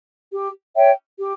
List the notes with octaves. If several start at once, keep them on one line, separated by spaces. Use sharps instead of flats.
G4
C#5 E5 G5
G4